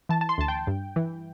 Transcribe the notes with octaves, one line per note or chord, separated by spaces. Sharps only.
E3 A5
A5
C6
D2 A5
G5
G2
E3